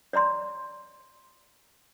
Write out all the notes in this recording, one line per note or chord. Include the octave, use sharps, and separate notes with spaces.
C#5 D5 A#5 C6